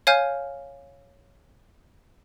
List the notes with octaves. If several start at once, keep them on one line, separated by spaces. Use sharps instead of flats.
C#5 F5 G#5 F6 G6